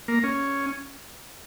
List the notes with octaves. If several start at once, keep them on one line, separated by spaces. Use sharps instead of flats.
A#3
C#4